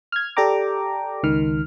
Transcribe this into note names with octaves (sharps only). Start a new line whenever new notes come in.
F6 G#6
G4 A4 D5 G5 A#5 D6
C#2 D#3 F6